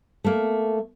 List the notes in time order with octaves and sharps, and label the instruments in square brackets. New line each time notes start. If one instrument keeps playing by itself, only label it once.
[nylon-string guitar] A3 A#3